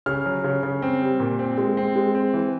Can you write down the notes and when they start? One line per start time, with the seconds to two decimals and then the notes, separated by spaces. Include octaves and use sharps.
0.06 C#3 F6
0.26 F#3
0.44 C#3
0.63 C#3
0.82 C4
1.01 G3
1.20 A#2
1.39 C4
1.58 G#3
1.77 C4
1.96 G#3
2.15 C4
2.34 E3